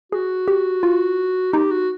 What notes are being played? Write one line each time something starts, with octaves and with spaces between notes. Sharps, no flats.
F#4 G#4
G4
F4
D#4 G4
F#4